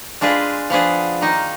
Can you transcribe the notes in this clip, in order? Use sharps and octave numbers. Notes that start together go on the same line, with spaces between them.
G#3 D4 F4 G#4 B4
F3 B3 D4 G#4
D#3 A#3 D#4